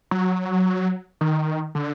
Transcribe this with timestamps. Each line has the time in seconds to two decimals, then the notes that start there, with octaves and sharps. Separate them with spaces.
0.11 F#3
1.21 D#3
1.75 D3